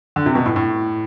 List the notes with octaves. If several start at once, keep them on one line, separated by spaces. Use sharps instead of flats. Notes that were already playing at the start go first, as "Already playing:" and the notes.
D3
C3
B2
A2
A2